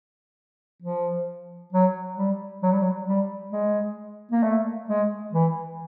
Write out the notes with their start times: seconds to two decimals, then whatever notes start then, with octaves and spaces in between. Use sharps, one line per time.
0.82 F3
1.73 F#3
2.17 G3
2.62 F#3
2.72 G3
2.82 F#3
3.07 G3
3.53 G#3
4.31 A#3
4.43 A3
4.88 G#3
5.33 E3